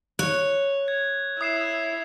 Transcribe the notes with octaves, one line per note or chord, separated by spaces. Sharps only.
C#5 F#6
G#6
E4 D#6 C7 E7